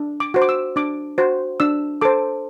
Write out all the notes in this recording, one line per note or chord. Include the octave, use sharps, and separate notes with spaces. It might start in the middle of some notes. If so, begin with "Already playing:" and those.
Already playing: D4
D6
F#4 C5
D6
E6
D4 D6
F#4 C5
D4 E6
A4 C5 D6